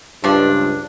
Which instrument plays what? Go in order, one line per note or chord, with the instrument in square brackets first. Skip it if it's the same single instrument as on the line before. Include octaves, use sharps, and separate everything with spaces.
[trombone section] C#2 G2 [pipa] F3 D4